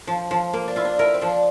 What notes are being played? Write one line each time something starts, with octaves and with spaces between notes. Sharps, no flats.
F3
F3
A#3
D4
E4 F4
D4
E4 A#4
C4
F3 D4